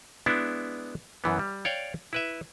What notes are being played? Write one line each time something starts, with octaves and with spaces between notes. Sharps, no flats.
G#3 B3 D4 E4
F#2 E3 B3
G3
C#5 D5 F5 G5
E4 B4 E5